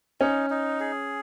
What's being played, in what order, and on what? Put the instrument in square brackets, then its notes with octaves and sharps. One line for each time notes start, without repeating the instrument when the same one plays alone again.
[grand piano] C#4 [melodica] D#4
[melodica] D#4
G#4